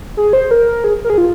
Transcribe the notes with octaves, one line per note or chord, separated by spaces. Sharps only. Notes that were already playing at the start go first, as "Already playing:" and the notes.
G#4
C5
A#4
G#4
A#4
G#4
F4